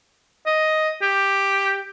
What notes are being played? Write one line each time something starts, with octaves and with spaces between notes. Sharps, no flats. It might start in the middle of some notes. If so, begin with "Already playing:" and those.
D#5
G4